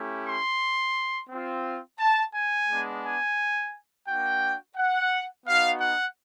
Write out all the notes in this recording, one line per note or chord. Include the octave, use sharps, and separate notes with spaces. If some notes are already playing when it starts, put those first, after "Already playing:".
Already playing: A3 C#4 E4 G4
C6
C4 F4
A5
G#5
G#3 B3 D4
G#5
A#3 D4 F#4 G5
F#5
B3 D#4 F#4 F5
F#5